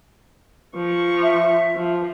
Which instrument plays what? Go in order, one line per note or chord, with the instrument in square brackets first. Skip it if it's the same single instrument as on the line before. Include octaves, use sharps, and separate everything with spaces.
[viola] F3 C#6
[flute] E5
[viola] F3